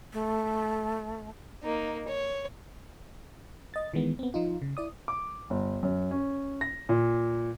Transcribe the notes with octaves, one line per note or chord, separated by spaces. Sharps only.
A3
A#3 D#4
C#5
D#5 A6
D#3 E3 G#3 B3
B3 C4
F3 D#4 F4
C#3
E4 D5 D#6
D6
G1
F#2
C#4
A#6
A#2